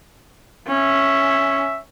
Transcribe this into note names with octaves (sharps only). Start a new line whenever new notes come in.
C#4 E5